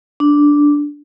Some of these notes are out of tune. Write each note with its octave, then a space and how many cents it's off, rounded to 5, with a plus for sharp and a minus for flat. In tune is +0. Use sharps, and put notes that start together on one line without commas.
D4 -5